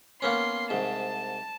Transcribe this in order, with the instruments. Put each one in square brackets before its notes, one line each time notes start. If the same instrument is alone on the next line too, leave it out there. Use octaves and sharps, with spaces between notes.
[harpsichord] A#3 B3 C#4 [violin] C6
[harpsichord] C2 G#2 [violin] A5